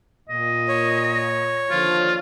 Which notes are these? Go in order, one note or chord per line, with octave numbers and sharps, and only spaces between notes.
A#2 D#5
C#5
D#2 D3 F3 F4